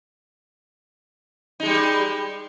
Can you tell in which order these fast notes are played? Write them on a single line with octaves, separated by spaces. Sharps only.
D#4 G#3 G3